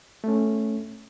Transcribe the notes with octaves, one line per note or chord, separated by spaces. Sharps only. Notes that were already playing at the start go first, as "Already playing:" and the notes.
A3 C#4